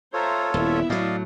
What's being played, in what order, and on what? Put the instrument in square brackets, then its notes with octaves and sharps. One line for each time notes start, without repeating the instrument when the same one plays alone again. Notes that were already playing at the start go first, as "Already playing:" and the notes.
[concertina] F4 A4 C#5 [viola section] C5 E5 A#5
[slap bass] D#1 [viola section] B3 E4 E5
[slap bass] A2 F#3 [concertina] D5 D#5 F5